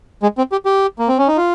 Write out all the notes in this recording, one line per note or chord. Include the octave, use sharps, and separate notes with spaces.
G#3
C4
G4
G4
A#3
C4
C#4
D#4
F4